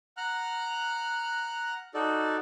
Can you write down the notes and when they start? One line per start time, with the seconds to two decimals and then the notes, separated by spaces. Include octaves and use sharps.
0.17 F#5 A#5 F6 F#6
1.94 D#4 F#4 A4 D5